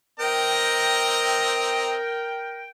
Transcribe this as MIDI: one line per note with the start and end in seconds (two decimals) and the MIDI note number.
0.20 1.95 60
0.20 2.69 70
0.20 1.95 75
0.20 2.69 79
0.20 1.95 82